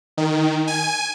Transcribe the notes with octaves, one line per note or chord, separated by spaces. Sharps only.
D#3
G#5